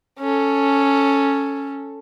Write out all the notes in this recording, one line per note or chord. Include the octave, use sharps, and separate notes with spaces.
C#4 A4